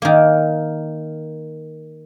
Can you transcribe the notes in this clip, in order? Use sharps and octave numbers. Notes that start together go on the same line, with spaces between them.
D#3 A#3